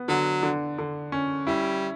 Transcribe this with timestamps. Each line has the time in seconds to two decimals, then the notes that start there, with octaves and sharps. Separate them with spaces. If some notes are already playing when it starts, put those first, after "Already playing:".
Already playing: B3
0.08 D3 F#3
0.43 D3
0.79 D3
1.12 C#4
1.47 G3 E4